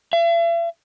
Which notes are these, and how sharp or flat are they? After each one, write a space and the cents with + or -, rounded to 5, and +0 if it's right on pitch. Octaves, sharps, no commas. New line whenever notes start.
E5 +45